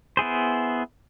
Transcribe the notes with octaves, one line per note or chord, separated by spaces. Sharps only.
B3 E4 G#4 C5